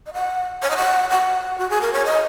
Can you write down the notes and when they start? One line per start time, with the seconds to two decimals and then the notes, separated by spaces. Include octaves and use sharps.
0.06 D#5
0.13 F#5
0.62 C#5
0.70 D#5
0.77 F#5
1.10 F#5
1.58 F#4
1.70 G#4
1.81 A#4
1.93 C#5
2.05 D#5